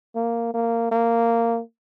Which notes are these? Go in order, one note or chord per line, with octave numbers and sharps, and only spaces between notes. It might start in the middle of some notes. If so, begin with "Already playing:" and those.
A#3
A#3
A#3